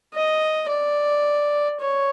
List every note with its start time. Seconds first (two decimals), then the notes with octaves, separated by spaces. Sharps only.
0.14 D#5
0.69 D5
1.80 C#5